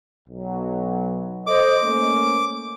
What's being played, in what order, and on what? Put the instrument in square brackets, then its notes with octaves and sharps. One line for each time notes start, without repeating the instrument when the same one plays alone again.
[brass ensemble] B1 F#3
[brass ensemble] A4 C5 D#5 [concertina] D6
[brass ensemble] A3 A#3 C#4